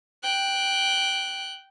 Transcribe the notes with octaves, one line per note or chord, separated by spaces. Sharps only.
G5 F#6